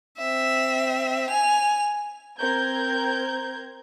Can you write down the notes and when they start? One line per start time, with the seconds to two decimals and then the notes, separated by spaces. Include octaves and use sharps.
0.18 C4 E5
1.30 G#5 F7
2.41 C4 A#4 G6 G#6